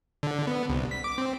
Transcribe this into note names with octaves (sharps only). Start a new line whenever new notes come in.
D3
B3
C2
B6
D6
C4